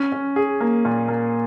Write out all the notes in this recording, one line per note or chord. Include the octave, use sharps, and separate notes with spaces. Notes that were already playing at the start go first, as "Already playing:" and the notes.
Already playing: C#4
C#4
G#4
A#3
A#2
A#3